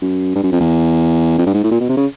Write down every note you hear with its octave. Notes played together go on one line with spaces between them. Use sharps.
F#2
G2
F#2
F2
E2
F2
G2
G#2
A2
A#2
B2
C3
C#3